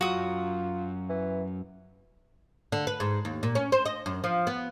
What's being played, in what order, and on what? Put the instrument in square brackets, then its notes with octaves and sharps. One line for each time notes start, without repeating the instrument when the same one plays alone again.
[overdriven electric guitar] F#2 [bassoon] F4 [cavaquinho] F#4 D#6
[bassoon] E3
[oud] D3
B4
G#2
D#2
A#2
C#4
C5
D#5
F#2
F3
B3